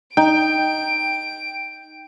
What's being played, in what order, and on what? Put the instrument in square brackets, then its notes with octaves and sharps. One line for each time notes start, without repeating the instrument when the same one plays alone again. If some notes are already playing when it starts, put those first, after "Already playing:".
[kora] D#4 [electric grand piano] G5 [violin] D7